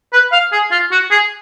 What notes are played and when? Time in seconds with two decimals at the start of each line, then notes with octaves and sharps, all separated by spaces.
0.13 B4
0.32 F5
0.52 G#4
0.71 F4
0.92 F#4
1.11 G#4